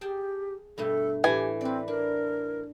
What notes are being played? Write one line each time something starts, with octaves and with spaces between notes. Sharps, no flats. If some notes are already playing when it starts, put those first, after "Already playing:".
G4 G#4 G5 A5
G2 B2 A3 A4
A2 E3 G4 G#5
C4 B4 D5
D4 A#4